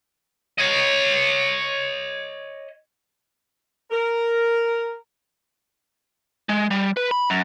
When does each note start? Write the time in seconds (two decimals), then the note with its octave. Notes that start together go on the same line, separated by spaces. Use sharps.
0.59 C#5 D#5
3.91 A#4
6.49 G#3
6.71 G3
6.97 B4
7.11 B5
7.30 F#2